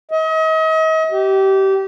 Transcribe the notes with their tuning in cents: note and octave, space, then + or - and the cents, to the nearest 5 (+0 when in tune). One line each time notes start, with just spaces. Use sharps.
D#5 +40
G4 -25